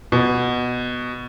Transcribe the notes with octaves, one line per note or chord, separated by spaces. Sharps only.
B2